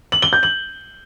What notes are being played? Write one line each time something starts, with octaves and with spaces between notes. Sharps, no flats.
F#7
G7
G6
F#7